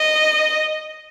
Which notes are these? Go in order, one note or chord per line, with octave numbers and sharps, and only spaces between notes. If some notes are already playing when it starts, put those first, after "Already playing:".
Already playing: D#5